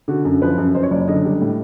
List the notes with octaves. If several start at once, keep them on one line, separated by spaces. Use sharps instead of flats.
D3 F#4
F#2
F3 B4
F#2
F#2 C5
C#5
F#1 D5
D3 D#5
G3
A2